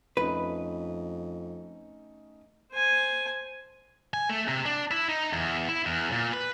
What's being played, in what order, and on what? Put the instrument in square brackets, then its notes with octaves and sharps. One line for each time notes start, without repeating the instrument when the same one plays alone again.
[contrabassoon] F2 [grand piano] A3 C#4 D#4 [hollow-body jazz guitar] B4
[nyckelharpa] C5 G#5
[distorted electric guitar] G#5
A3
C3
D4
E4
D#4
E2
E4
E2
A#2
B4